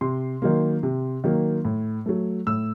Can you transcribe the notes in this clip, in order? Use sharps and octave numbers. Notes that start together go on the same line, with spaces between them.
C3 C6
D#3 F#3 A#3
C3
D#3 F#3 A#3
A2
F#3 A3
A2 E6